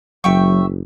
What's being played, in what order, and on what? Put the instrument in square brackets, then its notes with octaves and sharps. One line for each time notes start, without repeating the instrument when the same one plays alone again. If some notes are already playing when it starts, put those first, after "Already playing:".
[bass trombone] F#1 [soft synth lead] F#3 [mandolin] E5 G5 C#6